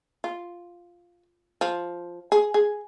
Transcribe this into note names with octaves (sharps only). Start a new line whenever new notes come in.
F4
F3
G#4
G#4